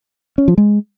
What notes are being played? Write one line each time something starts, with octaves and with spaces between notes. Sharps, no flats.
C#4
F3
G#3